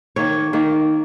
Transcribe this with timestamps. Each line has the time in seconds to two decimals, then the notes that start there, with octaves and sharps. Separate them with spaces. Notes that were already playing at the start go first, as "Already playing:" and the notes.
0.16 D#3 A#3 C#5
0.53 D#3 A#3